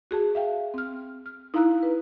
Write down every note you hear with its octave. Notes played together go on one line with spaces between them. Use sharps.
F#4 G#4 A5
E5 F5 G5
C4 F6
F6
D#4 E4 F5 A#5 E6 F#6
B4